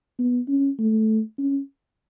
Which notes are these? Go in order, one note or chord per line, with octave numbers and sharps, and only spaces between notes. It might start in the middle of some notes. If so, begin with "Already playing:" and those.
B3
C#4
A3
C#4